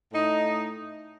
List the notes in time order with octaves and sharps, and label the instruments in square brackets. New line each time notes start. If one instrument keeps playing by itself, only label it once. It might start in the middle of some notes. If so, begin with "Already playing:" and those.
[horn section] A2 A3 D#4